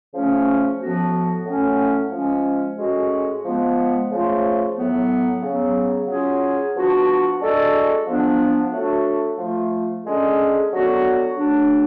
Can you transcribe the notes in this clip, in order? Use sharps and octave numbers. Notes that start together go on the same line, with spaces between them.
C#3 F3 A3 C#4
A2 F3 B3 F#4
A2 F#3 A3 C#4
F3 G#3 C#4
A2 G#3 C#4 F#4
F3 G#3 B3
C#3 F3 A3 F4
A2 F#3 B3
C#3 F#3 B3
C#3 F#3 C#4 F4 G#4
F3 B3 D4 F#4
G#3 D4 F#4 A4
F3 B3 D4
F#3 A3 D4 F#4 A4
F3 A3 F4
D3 G#3 C#4 G#4
D3 F#3 B3 F#4
C#3 F#3 A3 D4